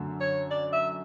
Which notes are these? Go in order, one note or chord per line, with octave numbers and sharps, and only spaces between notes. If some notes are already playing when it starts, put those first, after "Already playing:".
Already playing: F#2 D3 A3
C#5
D5
E5